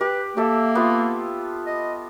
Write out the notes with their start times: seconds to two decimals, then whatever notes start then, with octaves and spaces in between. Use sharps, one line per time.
0.01 G4 B4
0.37 A#3 G4 A4 E5
0.75 B3 F4
1.67 D#5